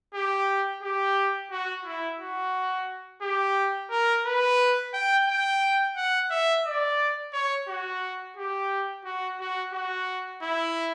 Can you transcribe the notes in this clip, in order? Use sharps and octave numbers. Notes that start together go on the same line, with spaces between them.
G4
G4
F#4
E4
F#4
G4
A#4
B4
G5
G5
F#5
E5
D5
C#5
F#4
G4
F#4
F#4
F#4
E4